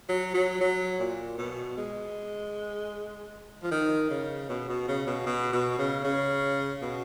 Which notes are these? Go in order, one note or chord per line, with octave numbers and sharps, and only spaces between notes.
F#3
F#3
F#3
A#2
B2
G#3
F3
D#3
C#3
B2
B2
C#3
B2
B2
B2
C#3
C#3
B2